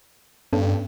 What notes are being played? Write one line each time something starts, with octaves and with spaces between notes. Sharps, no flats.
G2 B3 C#4 A4